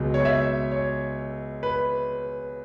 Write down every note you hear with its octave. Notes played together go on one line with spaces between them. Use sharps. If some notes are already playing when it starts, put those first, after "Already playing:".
Already playing: C#2 B2 F#3
C#5
E5
C#5
B4